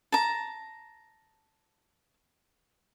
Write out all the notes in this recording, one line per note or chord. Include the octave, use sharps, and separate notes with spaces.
A5 A#5